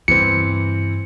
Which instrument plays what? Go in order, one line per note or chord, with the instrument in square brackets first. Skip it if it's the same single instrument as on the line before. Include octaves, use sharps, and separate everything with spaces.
[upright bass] G2 C#3 [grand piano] E3 C4 [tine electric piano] C#7